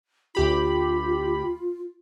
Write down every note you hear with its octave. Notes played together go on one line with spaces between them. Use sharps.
D2 F4 G4 B5